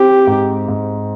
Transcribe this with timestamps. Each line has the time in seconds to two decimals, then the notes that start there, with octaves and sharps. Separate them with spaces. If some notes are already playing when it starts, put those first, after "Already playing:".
Already playing: C4 G4
0.27 G#2
0.68 G#2